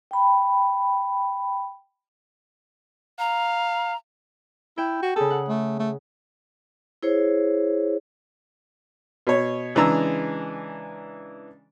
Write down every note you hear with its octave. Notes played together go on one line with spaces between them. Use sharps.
G5 B5
F5 A#5
E4 G5
F#4
C#3 G#4 A4
F#5
A3
A3
E4 G#4 C5 C#5
B2 C#5
C#3 E3 G#3 D4 A#5 E6